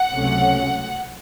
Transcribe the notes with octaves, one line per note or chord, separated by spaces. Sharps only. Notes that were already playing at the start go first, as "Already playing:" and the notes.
Already playing: F#5
C#2 C3 F#3 A3 C#4